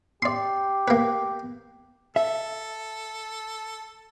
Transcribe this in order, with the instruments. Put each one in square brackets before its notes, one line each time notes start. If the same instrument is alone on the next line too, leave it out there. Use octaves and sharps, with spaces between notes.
[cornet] G4 [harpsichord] D5 C6
[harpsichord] A#3 B4
[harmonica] A4 [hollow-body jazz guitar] E5